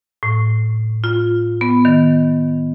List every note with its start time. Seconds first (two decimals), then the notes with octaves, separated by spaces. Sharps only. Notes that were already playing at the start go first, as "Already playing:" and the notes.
0.23 A2
1.04 F4
1.61 B3
1.85 D#3